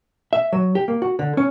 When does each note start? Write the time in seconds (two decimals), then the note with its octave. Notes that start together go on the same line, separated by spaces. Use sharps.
0.33 E5
0.52 F#3
0.75 G4
0.88 A#3
1.02 F#4
1.19 D3
1.37 C#4